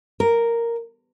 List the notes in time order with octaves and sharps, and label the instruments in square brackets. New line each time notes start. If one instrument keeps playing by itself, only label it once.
[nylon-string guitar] A#4